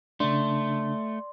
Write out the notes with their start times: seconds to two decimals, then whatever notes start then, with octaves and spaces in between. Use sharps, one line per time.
0.20 C#3 A3 D4 D5 C6